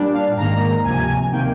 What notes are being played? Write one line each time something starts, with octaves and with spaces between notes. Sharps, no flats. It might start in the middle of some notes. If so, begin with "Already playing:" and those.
Already playing: A#2 G3 D4
F5
G#2 D#3 A#3 A#5
D2 C3 F3 G#5
C3 D#3 A#3 G5